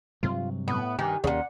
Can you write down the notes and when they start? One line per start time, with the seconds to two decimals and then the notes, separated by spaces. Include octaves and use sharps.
0.23 G2 C3 F#3 F4
0.68 A2 B3
0.99 G2 D#3 G4 G#5
1.24 D#2 A#2 C#3 C#4 F#5